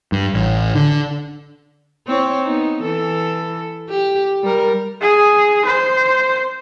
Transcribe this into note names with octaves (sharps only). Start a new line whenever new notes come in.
G2
A1
D3
C4 E4 C#5
B3 D#4
E3 A4
G4
G3 A#4
G#4
C5